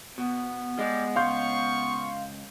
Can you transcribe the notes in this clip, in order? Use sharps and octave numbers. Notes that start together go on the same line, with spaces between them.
B2 B3
G3 G#3 D5
C#2 F5 C6 C#6 G6